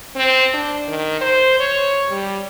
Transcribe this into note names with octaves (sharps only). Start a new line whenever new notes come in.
C4
D4
D#3
C5
C#5
G3